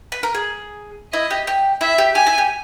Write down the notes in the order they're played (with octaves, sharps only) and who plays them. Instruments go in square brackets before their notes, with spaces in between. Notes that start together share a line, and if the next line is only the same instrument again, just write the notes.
[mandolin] B4
A#4
G#4
[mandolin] E4 [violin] D#5
[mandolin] G4
G4
[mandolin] E4 [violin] E5
[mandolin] G4
[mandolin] G4 [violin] G#5
[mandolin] E4
G4